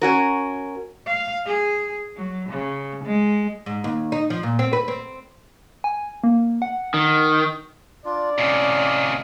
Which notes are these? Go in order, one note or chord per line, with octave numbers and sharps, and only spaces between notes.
C#4 F#4 A#4
F5
G#4
F#3
C#3
G#3
G#2
D#2
D#4
F3
A#2
C4
B4
C4
G#5
A#3
F#5
D#3
D4 F4 D5
A2 C3 C#4 D#5 F5